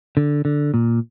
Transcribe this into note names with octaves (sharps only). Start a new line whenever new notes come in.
D3
D3
A#2